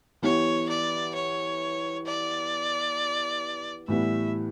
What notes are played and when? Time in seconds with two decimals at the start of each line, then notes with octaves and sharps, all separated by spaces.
0.22 E3 B3 E4 G4 C#5
0.69 D5
1.14 C#5
2.06 D5
3.88 A2 E3 G3 B3 E5